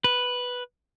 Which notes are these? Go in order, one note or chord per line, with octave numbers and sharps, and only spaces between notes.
B4